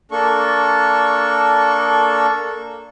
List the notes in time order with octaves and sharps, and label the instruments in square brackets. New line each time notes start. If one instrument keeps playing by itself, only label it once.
[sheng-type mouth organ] A#3 D4 A4 C#6